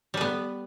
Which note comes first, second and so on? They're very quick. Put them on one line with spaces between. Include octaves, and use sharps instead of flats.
G3 B4 B3